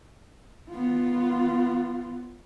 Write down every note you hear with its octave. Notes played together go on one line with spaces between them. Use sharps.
B3 F4